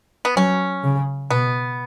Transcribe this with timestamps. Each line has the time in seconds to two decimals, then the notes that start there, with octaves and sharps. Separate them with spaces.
0.25 B3
0.36 F#3 C#4
0.83 C#3
1.30 B2 B3